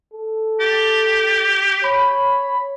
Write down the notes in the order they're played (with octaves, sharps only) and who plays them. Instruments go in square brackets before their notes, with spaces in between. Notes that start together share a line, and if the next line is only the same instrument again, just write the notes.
[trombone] A4
[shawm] G4 [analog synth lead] A6
[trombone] C#5 [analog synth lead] B5